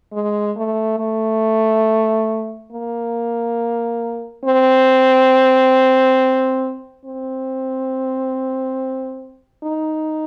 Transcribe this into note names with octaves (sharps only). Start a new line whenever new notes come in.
G#3
A3
A3
A#3
C4
C4
D#4